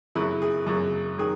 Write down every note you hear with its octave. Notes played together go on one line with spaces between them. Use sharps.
F#2 C#3 F#3 E4
G#4
F#2 C#3 F#3
D#3 F#3 G#4